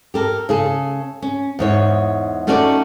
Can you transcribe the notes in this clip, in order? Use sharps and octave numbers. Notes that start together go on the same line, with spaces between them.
G4 A4 A#4
C#3 G#4 A4
C#4
E2 G#2 C#5
A3 C#4 D#4 F#4 A4 D5